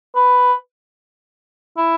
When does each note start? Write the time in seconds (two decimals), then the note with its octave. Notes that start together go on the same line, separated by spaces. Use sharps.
0.15 B4
1.77 E4